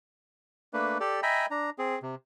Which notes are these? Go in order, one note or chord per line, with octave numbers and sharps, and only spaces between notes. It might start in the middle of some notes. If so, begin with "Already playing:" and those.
A3 A#3 D4 B4
G4 A4 D5
D#5 E5 G5 G#5 A#5 B5
D4 A#5
C4 G#4
C3